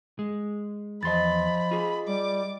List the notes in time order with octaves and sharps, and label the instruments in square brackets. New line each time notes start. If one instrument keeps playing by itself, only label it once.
[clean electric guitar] G#3
[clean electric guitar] E2 C6 [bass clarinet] F3 [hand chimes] D#5 A6 [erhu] B5
[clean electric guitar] F4 G#4
[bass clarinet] G3 [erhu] D6